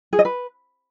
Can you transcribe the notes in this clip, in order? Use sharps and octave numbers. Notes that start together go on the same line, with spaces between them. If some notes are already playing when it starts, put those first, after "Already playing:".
G#4
D#5
B4